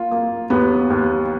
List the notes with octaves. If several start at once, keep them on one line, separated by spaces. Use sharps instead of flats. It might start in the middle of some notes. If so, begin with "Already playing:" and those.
Already playing: A#3 F4
A#3
D#2 B3
D#2